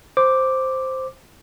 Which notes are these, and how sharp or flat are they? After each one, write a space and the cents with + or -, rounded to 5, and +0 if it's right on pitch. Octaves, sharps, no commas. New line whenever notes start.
C5 +0 D6 +0